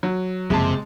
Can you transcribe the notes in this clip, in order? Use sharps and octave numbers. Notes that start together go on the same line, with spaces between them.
F#3
F#1 F2 C3 G#3 A5